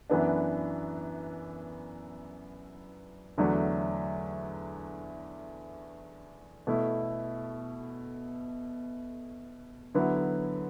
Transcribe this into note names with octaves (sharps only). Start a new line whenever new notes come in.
F#2 E3 B3 D4
E2 D3 F#3 A3 D4
B2 A3 E4
D3 F#3 B3 E4